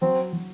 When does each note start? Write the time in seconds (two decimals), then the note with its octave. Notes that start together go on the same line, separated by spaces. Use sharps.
0.02 F#3 C4
0.33 F#3